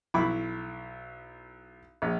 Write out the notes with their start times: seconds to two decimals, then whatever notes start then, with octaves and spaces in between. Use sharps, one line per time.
0.14 B1 E4 B5 C#6 D6
2.02 A#1